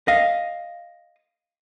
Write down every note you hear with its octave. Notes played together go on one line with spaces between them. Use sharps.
D#5 F5